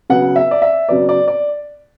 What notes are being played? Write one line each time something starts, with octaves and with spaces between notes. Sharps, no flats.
C#3 F#3 B3 F#5
E5
D5
E5
C#3 F#3 B3 D5
D5
D5